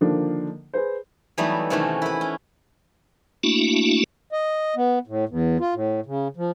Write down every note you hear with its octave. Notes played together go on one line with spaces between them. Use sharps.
D3 D#3 F3 A#3 D4
G#4 B4 C5
E3 F#3 G3 A3 B3 D#4
C3 D#3 E3 A3 C#4 F#4
E4 B4
C#4
A3 A#3 D4 E4 F#4
D#5
B3
A2
E2
F4
A2
C#3
F3